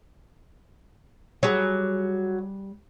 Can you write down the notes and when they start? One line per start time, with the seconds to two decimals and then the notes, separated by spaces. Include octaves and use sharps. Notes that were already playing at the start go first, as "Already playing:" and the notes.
1.43 F#3 G3 G#4